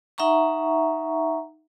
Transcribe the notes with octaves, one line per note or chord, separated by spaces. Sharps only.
D#4 E5 F#5 A#5 C#6